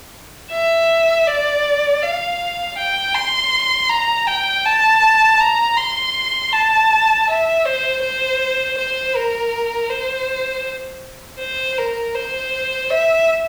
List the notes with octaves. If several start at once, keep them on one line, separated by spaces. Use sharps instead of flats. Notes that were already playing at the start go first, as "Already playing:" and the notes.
E5
D5
F5
G5
C6
A#5
G5
A5
A#5
C6
A5
E5
C5
C5
C5
A#4
C5
C5
A#4
C5
E5